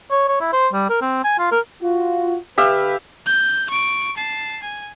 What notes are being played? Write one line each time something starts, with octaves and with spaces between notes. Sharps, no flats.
C#5
C#5
E4
C5
G3
A#4
C4
G#5
F4
A#4
F4 F#4
D3 G4 B4 E5 F5
G6
C#6 D7
A5 C7
G#5